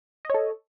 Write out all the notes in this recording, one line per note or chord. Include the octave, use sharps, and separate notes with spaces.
A4 C#5 D#5